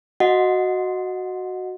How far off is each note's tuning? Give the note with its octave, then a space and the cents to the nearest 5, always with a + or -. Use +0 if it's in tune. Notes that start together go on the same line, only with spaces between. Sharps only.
F#4 +0 D#5 +0 F#5 -25